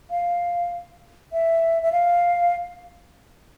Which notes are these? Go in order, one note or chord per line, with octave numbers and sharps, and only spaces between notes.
F5
E5
E5
F5